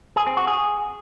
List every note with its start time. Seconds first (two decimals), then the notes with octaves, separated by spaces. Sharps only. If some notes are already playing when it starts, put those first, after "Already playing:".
0.16 G#4
0.27 C4
0.37 F#4
0.47 G#4